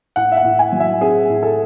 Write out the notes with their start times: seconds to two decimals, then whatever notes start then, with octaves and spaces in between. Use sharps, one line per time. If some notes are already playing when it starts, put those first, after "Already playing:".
0.16 A2 F#5
0.32 E5
0.37 F#5
0.44 A2
0.59 G#5
0.72 F#3
0.80 E5
1.01 C4 G#4
1.30 A2
1.43 A4